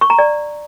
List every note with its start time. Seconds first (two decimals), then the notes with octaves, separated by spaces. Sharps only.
0.01 C#6
0.10 A#5
0.19 D5